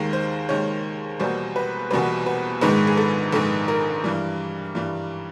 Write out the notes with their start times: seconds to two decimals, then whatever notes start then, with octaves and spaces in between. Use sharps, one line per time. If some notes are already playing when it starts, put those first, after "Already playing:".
Already playing: D#2 D#3 G#3 A#4
0.13 C5
0.49 D#2 D#3 G#3 C#5
1.20 E2 B2 G3 A#3 C5
1.56 B4
1.90 E2 B2 G3 A#3 B4
2.26 B4
2.61 A#1 G#2 D#3 G#3 B4
2.87 G#4
2.97 A4
3.32 A#1 G#2 D#3 G#3 A4
3.68 A#4
4.04 G2 E3 G3
4.75 G2 E3 G3